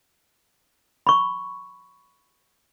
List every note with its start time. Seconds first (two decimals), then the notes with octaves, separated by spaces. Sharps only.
1.07 B5 C#6